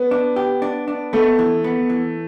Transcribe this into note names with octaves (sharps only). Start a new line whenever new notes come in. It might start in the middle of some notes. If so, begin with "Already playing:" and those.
Already playing: B3
D4
G4
D4
D4
A3 B3
E3
B3
E3